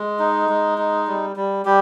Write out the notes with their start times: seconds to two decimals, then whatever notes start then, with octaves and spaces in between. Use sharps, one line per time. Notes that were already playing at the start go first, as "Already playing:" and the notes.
Already playing: G#3
0.19 D#4
0.49 G#3
0.78 D#4
1.07 G3
1.36 G3
1.65 G3 G4